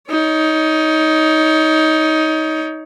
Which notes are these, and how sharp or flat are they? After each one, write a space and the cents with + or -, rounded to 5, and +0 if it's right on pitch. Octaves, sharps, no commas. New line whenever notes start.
D#4 +15 C#5 +30